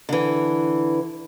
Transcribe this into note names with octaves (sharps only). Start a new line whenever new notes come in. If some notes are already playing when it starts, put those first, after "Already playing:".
D3 E3